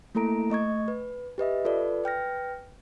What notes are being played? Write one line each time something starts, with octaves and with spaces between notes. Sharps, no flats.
A3 A#3 E4 A4 A#5 D7
A3 D#5 C#6 G#6
B4
G4 B4 D#5 E5
F4 A4 B4 D5
B4 G5 F6 A#6